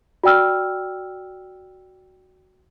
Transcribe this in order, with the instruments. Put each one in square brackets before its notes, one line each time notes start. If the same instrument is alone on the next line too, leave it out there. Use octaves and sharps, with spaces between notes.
[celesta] F#4 D5 G5 E6 F6